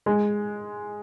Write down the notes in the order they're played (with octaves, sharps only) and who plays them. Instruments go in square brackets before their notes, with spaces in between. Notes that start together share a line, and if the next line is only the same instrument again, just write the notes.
[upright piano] G#3